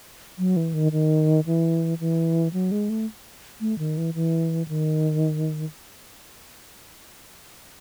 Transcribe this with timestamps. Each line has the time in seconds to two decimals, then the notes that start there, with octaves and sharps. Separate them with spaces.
0.38 F#3
0.57 E3
0.74 D#3
0.92 D#3
1.46 E3
2.00 E3
2.53 F#3
2.71 G#3
2.90 A3
3.61 A3
3.79 D#3
3.98 E3
4.14 E3
4.68 D#3